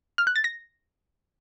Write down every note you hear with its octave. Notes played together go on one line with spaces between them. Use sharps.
F6
F#6
A6
A#6